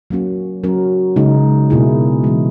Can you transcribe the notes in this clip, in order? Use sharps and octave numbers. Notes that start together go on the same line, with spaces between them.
F#3 A#3 C#4 F#4
F#3 C#4 F#4 A#4
C#3 G#3 D#4
B2 A#3 E4 G#4
E3 G#3 C#4